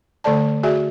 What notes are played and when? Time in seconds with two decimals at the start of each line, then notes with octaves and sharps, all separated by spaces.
0.24 D3 A3 A4 D5 A5
0.63 F#4 G#4 D5 E5 G#5